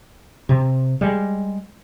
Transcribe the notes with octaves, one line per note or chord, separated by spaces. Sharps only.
C3
G3 G#3